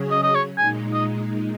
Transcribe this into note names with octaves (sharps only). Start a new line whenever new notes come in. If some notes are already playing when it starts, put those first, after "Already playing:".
Already playing: C#3 F#3 C#4 G#4 C#5
D#5
D#5
C#5
A#2 G#3 D#4 G#5
D#5